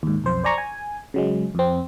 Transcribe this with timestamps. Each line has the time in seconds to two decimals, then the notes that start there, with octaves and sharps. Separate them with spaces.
0.03 D#2 G#2
0.24 B1 F2 C5
0.44 C5 D5 G#5 A#5 C#6
0.58 G#5
1.14 C#3 F#3 G#3
1.55 F2 C4